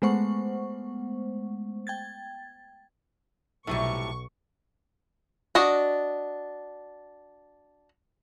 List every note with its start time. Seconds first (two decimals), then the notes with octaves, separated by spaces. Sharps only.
0.02 G#3 A3 B3 C5 F#5 C#6
1.87 G5 G#6 A6
3.67 B1 A2 C3 G3 C#6
5.55 D4 F#4 D#5